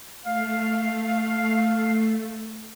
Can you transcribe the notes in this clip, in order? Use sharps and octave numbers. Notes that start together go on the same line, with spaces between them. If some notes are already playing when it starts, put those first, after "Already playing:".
A3 F5